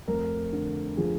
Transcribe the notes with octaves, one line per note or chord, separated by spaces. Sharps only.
F1 A#4
D3
F3 G#4